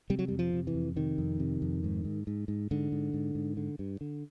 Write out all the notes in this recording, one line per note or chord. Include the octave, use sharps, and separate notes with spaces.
C3 G3
F#3
G3
F2
F3
C3
E3
F2
C3 D#3
F2
C3
F2
G#2
G#2
G#2
G#2
G#2 D3
G#2
G#2
G#2
D3
G2
D3